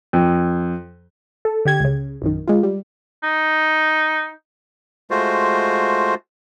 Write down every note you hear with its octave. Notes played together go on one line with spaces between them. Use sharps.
F2
A4
D3 G4 G#6
C#2 C#3
A#1 F#2 D#3
G#3 F4
G3
D#4
G#3 A3 F4 F#4 C5